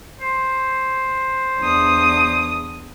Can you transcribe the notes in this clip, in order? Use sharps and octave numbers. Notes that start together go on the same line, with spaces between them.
C5
E2 D4 D#6